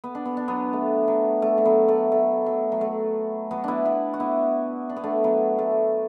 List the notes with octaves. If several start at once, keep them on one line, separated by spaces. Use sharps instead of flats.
B3
D4
B3
D4
F#3 B3
A3
F#3
A3
A3
F#3 B3
A3
A3
F#3
F#3
A3
F#3 B3
B3 D4 E4
B3 E4
F#4
B3 E4
D4
B3
A3 D4
F#3 B3
A3